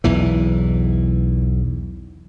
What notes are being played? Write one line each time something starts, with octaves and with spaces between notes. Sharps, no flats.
B1 E2 E3